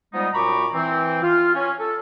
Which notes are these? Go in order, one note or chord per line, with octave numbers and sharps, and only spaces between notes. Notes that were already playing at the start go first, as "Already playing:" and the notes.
F3 G3 G#3 B3 D#4
F#2 A#2 A#5 B5 C#6 D6
E3 C4
F4
C#4
A4